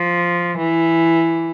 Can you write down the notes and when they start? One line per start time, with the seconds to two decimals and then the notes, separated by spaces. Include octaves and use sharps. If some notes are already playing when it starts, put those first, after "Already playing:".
Already playing: F3
0.58 E3